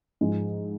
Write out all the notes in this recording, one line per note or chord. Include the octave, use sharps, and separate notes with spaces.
G#2 F3 G#3